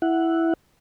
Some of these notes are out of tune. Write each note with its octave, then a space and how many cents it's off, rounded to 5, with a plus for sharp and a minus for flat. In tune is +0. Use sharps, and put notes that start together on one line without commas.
E4 +0 F#5 +0